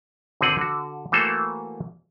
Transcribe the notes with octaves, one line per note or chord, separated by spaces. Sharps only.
G#1 D3 C4 G#4 F#5
D3 F#4
E3 A3 A#3 F#4 A4 C5